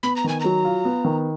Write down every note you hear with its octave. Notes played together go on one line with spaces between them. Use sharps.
B3 B5
A#5
D#3 G#5
F#3 A#5
F4
B3
D#3